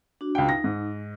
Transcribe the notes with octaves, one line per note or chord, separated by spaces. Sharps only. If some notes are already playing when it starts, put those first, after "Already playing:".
D4 F#4
C#2 G5
D#4 A#6
G#2